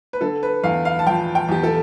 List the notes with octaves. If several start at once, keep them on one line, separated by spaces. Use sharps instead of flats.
B4
D3 A4
B4
E2 F5
F5
A5
F3 G5
G5
E2 G4
A4